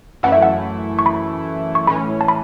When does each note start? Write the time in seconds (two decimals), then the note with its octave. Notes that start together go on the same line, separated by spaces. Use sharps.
0.23 F#2 E3 A3 E4 F#5
0.32 E5
0.42 F#5
0.99 C#6
1.06 B5
1.75 C#6
1.87 A2 E3 C#4 B5
2.21 A5
2.28 B5